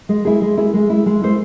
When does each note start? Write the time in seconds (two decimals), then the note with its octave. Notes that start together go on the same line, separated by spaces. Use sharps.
0.09 G#3
0.25 E4 G#4
0.42 G#3
0.57 E4 G#4
0.74 G#3
0.90 E4 G#4
1.06 G#3
1.21 E4 G#4 C5